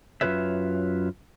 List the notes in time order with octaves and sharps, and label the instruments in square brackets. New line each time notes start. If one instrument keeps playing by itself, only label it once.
[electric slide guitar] F#2 F#3 F4 B4 C#5 E5